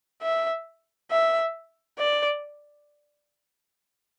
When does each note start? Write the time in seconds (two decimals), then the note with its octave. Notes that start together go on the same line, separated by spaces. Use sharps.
0.22 E5
1.11 E5
1.99 D5